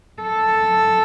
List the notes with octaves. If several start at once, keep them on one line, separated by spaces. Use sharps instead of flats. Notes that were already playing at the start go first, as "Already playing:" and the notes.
A4